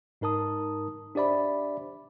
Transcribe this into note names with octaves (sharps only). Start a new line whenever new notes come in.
G#2 D#4 A#4 A5 D#6
D4 G4 C5 D5 E5 B5